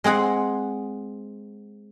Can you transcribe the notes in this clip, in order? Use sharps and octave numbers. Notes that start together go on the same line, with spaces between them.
G#3 C4 G#4 F#5